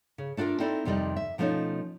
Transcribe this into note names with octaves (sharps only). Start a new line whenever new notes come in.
C#3
A3 D4 F4 A4 A#4
C4 D#4 E4 A4 D5
F2 C3 D#3 G3 D5 D#5
E5
B2 F3 A3 C4 C#4 D#4